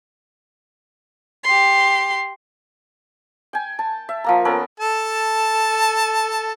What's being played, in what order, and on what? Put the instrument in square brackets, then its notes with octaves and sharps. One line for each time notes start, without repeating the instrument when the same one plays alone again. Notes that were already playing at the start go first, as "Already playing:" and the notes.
[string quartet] G4 C6
[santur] G5 G#5
A5
E5
F3 A#3 A#5
B3 C#4 A4 A#4
[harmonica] A4 A5